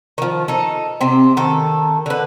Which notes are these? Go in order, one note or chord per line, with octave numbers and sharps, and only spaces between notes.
D#3 F3
D#4 A4
C3 C4
D#3 A4
D3 B4